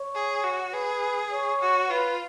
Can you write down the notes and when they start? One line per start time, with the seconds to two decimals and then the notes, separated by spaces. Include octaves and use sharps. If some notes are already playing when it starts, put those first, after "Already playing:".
Already playing: C#5
0.15 G#4
0.44 F#4
0.73 G#4 B4
1.31 C#5
1.61 F#4
1.90 F4 B4